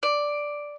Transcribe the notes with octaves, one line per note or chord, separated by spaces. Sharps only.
D5